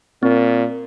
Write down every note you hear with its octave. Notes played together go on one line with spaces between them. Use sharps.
A#2 C4